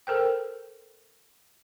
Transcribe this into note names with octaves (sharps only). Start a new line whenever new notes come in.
A4 A#4 C5 G5